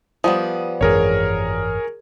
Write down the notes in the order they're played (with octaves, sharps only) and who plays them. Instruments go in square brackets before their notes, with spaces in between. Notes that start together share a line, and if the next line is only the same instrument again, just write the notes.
[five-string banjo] F3 G3 B3 [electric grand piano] D#6
[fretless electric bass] G#1 F#2 E3 [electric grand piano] G#4 A#4 C#5